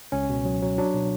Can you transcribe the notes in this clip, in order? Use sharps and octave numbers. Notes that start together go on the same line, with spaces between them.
C#2 C#4
B2
F#3
F#3
F#3 D4
B2